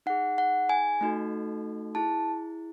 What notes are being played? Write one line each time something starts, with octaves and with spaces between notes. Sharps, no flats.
D#4 G#4 F#5
F#5
G#5
A3 D#4 F#4 A4
E4 G#4 A5